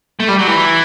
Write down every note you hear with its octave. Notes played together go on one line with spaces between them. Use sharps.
A3
G3
F#3
E3